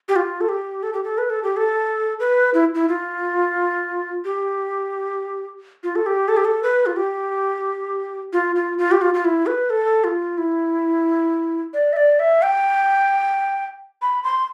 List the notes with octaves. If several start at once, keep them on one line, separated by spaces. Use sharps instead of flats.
G4
F4
A4
G4
A4
G4
A4
B4
A4
G4
A4
B4
E4
E4
F4
G4
F4
A4
G4
A4
G4
A4
B4
F4
G4
F4
F4
F4
G4
F4
F4
E4
B4
A4
F4
E4
D5
E5
D5
E5
G5
B5
C6